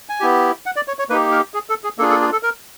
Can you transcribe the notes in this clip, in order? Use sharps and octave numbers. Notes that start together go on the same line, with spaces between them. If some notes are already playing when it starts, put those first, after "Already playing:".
G#5
B3 E4 G4
F#5
D5
C#5
C#5
A#3 D#4 G4 B4
A#4
G#4
A4
G#4
A#3 D4 F4 G#4 A4
A4
G#4
A4
A#4